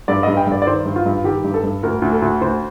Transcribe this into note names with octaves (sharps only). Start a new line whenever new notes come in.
G2 D5
G2 D#5
G5
G2 D5
D5
D#3 C5
G2
F4
G2
D#3 G4
G2
A4
G2
D2 A#4
D2
A4
D2
D2 C5